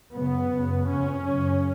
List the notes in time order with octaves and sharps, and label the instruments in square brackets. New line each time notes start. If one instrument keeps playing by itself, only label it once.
[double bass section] F#2 C#3 B3
F#2 C#3
F2 C#3 C#4
F#2 C#3